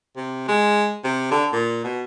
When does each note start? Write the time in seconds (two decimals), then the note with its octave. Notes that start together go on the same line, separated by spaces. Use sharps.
0.16 C3
0.48 G#3
1.04 C3
1.31 D3
1.52 A#2
1.84 B2